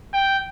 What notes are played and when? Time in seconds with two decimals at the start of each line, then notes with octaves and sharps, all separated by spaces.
0.14 G5